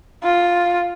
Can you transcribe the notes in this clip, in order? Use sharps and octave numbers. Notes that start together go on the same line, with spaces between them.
F4